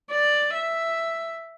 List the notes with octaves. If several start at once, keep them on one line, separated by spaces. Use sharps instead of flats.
D5
E5